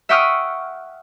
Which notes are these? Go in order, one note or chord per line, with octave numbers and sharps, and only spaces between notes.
E5 F#5 G5 C#6 D#6 F6